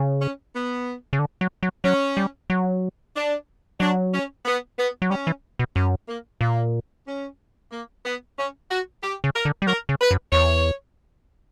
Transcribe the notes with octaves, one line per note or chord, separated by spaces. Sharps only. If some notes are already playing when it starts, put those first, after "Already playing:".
Already playing: C#3
C#4
B3
C#3
D3
F#3
F#3
F#3 C#4
G3
F#3
D4
F#3 D4
C#4
B3
B3
F#3
G3 C#4
E3
B2
F#2 C#4
A#3
A#2 A#3
C#4
A#3
B3
C#4
F#4
G4
C#3
A#4
D3
G3
F#3 A#4
C#3
B4
F#2
E2 C#5